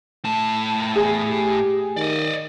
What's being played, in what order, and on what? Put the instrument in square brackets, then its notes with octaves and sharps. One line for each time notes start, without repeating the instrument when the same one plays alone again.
[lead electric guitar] A2 A5
[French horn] E2 [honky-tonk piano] G#4
[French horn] G4
[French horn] D#3 [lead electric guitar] D5 D#5